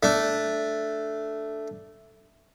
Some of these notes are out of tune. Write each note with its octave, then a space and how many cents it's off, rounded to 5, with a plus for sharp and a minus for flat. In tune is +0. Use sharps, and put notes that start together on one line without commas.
A3 +0 D4 +0